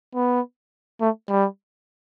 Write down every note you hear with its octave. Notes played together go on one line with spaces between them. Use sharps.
B3
A3
G3